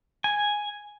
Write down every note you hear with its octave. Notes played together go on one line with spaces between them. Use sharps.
G#5